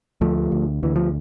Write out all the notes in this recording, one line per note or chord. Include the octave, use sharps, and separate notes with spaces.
D2 F3 A3
D2
D2 E3
F3